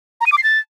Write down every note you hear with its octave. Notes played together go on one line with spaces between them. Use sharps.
A#5
D#7
D6
C7
A6